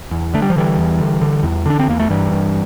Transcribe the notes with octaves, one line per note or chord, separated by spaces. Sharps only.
E2
D3 A3
G3
F3
D3 E3 G3
E2
D3
D3
E2
D3 D4
C4
E2 A#3
A3
G2 E3 G3
G2